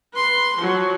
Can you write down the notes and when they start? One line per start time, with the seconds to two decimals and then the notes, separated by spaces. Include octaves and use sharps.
0.13 B4 C6
0.56 F3 F#3